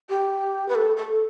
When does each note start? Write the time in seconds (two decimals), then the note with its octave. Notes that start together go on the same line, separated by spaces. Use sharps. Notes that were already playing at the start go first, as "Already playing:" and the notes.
0.10 G4
0.69 B4
0.75 A4
0.97 A4